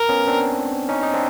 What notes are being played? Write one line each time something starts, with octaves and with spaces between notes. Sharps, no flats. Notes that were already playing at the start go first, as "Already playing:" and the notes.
Already playing: A#4
B3 C#4
C4 D4
C#4 D#4
D#4
C4 D4